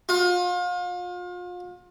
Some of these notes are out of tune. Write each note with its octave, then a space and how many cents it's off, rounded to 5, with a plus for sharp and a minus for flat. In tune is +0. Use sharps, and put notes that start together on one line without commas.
F4 +35